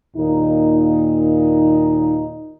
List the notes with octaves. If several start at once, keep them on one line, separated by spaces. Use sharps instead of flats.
D#2 A#2 D#4